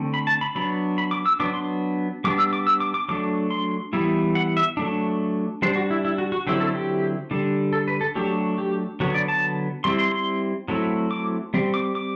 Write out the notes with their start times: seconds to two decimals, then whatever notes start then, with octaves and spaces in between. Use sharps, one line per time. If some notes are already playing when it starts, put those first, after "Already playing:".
Already playing: D3 A3 C4
0.14 B5
0.27 A5
0.41 B5
0.55 F#3 B3 D4 B5
0.98 B5
1.11 D6
1.26 E6
1.40 F#3 B3 D4 D6
1.54 C6
2.24 G3 B3 D4 D6
2.38 E6
2.53 D6
2.67 E6
2.80 D6
2.94 D6
3.09 F#3 A3 D4 D6
3.51 C6
3.93 E3 G3 B3 E4
4.35 F#5
4.57 E5
4.77 F#3 A3 D4
5.62 G3 D4 C5
5.76 F#4
5.90 E4
6.05 E4
6.18 F#4
6.32 F#4
6.47 D3 F#3 C4 E4 G4
6.60 A4
6.75 G4
7.31 D3 G3 D4
7.73 A4
7.88 B4
8.01 A4
8.15 F#3 A3 D4 G4
8.58 G4
9.00 D3 F#3 B3 F#4
9.14 D5
9.28 A5
9.84 G3 C4 E4 C6
9.98 C6
10.12 C6
10.68 F#3 A3 C4 E4
11.11 D6
11.54 G3 C4
11.74 D6
11.95 D6